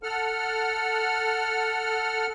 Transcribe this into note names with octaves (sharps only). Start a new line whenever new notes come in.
A4 F#5 F6